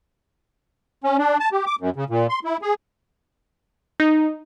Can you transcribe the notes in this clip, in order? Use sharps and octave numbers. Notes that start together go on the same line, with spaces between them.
C#4
D4
A5
G4
D6
F#2
C#3
A#2
C6
E4
G#4
D#4